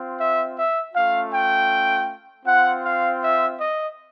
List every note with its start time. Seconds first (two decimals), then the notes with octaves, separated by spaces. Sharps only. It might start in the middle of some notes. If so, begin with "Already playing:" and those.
Already playing: C4 F4
0.18 E5
0.56 E5
0.93 A3 C#4 F4 F5
1.32 G5
2.45 C4 F4 F#5
2.84 F5
3.22 E5
3.59 D#5